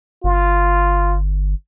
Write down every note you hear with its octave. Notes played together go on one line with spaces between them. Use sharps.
G1 F4